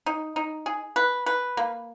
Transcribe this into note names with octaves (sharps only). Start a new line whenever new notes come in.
D#4
D#4
G#4
B4
B4
A#3